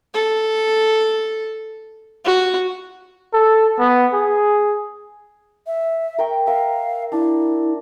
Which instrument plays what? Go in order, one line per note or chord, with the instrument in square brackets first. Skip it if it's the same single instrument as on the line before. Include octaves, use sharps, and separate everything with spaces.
[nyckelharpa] A4
F#4
[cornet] A4
B3
G#4
[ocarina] E5
[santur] A#4 G5 C#6
[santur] A#4 E5 [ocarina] F5
[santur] D4 [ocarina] E4